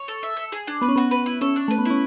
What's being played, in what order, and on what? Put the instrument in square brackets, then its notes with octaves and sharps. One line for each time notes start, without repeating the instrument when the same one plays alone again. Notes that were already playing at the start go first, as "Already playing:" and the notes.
Already playing: [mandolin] C#5
A4
E5
A4
G#4
D4
[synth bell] B3 [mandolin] B4
[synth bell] C#4
[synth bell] B3 [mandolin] F#4
[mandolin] B4
E4
[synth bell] C#4 [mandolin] A4
[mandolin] D4
[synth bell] A3 [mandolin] B4
[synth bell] B3
[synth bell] C#4 [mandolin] E4